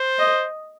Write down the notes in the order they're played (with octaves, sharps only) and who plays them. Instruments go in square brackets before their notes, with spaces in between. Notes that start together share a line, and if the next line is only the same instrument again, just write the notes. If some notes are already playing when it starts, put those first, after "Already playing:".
Already playing: [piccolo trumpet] C5
[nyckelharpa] D#5